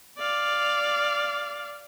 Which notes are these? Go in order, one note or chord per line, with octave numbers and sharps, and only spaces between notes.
D5 F5